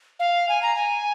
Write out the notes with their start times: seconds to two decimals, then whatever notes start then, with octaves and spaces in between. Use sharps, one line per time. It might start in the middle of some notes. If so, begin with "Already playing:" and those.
0.20 F5
0.49 G#5
0.62 A#5
0.75 G#5